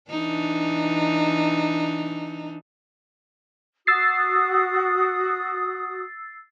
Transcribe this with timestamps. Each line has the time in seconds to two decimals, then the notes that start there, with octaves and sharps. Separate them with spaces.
0.11 E3 D4 D#4
3.87 F#4 D#6 E6 A6 C7